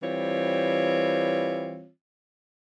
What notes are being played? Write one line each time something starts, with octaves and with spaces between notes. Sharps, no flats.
E3 G3 C4 F4 C#5